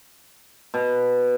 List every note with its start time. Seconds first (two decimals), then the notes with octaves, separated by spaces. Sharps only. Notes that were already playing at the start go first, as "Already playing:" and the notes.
0.74 B2